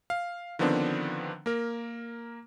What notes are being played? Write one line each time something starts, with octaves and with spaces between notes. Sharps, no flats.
F5
D3 D#3 F3 B3 C4 D4
A#3 A#4